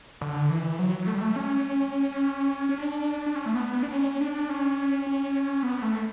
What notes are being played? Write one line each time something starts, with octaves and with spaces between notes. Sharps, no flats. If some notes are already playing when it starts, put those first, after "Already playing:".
D3
E3
F#3
A3
G3
A3
C#4
C#4
D4
D4
C#4
A3
B3
B3
D4
C#4
D4
C#4
C#4
B3
A3